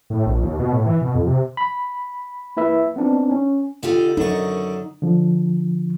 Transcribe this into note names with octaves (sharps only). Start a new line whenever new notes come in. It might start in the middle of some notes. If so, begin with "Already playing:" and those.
A2
A#1
D#2
B2
A2
E3
B2
F2
C3
B5
A#3 E4 B4 E5
B3 C4 D4 D#4
C#4
D3 D#4 F4 G4
F#2 D3 D#4 A#4 C#6
D3 F3